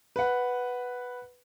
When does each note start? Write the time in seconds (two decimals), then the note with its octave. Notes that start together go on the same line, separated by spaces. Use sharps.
0.16 B4 F#5